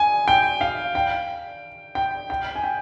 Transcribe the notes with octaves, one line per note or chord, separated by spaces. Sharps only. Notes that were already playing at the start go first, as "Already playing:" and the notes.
Already playing: G#5
G5
F5
G5
G5
G5
G#5
G5